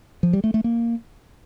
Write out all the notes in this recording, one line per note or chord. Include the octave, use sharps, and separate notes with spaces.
F3
G3
A3
A3
A#3